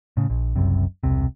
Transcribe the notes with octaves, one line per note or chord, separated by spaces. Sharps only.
A2 C#3
A#1
F#1 C2 F#2 C3
E1 C2 C3